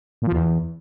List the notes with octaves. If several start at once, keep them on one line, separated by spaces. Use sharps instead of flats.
A#2
F3
E2